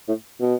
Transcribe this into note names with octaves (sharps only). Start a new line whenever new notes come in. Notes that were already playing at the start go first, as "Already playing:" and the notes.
A2
B2